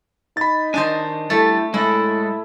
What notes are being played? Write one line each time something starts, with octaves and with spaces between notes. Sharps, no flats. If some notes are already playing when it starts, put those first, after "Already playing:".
D#4 B5 A6
D#3 D4 C5 D#5 G#5 A5
G3 A3 E4 A4
A2 G#3 E4 A4